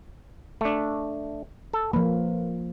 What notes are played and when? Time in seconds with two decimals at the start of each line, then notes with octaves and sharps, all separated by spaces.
0.61 A3 D4
1.73 A4
1.93 F3 A#3 B4